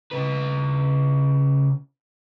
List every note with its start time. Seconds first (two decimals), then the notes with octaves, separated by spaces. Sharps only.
0.11 C#3 B4